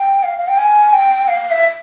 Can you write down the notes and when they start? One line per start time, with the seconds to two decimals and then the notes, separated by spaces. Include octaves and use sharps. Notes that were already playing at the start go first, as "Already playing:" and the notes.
Already playing: G5
0.23 F5
0.38 F5
0.48 G5
0.58 G#5
0.93 G5
1.28 F5
1.51 E5